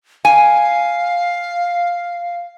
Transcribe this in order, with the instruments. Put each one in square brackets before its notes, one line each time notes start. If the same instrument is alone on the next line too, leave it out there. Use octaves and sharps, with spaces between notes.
[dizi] F5 [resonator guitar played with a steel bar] G#5